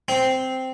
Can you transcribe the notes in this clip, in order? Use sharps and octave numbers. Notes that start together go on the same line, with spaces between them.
C4